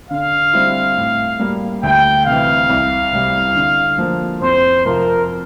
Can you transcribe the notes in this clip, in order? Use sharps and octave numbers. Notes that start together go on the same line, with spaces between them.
D3 F5
G3 C4 E4
A2
G3 A#3
D2 G5
C3 E3 F5
C2
C3 G3
D3
F3 A#3
F2 C5
C3 F3 C4 F4 A#4